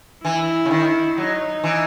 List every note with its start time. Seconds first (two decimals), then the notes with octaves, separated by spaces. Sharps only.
0.25 E3 E4
0.65 C#3
0.71 D#3
1.17 F#3 D#4
1.64 E3